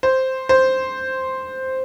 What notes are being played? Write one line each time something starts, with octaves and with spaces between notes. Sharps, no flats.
C5
C5